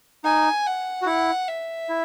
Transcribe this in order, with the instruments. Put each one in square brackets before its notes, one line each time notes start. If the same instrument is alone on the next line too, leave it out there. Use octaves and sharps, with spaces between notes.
[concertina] D#4 [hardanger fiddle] G#5
[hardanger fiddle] F#5
[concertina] F#4
[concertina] E4 [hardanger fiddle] F#5
[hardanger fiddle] E5
[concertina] E4